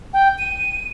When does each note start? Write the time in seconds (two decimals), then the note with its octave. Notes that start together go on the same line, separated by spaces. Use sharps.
0.13 G5
0.38 D#7